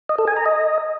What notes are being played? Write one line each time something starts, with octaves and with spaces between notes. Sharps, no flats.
D#5
A4
G#5
A#5
D#5